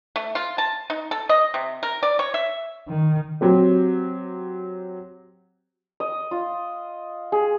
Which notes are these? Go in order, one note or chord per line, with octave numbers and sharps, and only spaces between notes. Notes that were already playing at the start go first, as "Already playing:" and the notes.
A3
F4
A5
D#4
A4
D#5
C3
A#4
D5
C#5
E5
D#3
F#3 C4 G4
D#5
F4
G#4